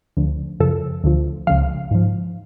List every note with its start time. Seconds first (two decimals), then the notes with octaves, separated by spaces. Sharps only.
0.17 D2 D3 F3
0.60 F#2 C#3 F3 A4
1.04 D2 D3 F3
1.47 C#2 C#3 F3 F5
1.91 G#2 F3